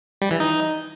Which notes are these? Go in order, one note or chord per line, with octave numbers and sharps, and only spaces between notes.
G3
E3
D#4